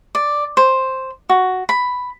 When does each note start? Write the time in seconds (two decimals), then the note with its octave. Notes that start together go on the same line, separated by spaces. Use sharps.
0.15 D5
0.57 C5
1.29 F#4
1.69 B5